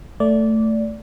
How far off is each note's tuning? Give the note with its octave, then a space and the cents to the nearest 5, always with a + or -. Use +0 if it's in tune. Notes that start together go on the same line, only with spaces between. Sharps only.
A3 +10 D5 -15